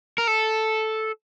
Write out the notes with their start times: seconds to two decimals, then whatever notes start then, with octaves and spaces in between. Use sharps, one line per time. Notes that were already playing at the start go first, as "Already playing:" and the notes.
0.18 A#4
0.27 A4